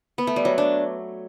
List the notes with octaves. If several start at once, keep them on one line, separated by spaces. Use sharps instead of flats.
B3
A3
G3
F#3
D4